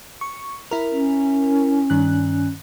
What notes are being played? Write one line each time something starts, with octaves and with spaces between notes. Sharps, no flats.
C#6
E4 A#4
C#4
G2 D#3 F#6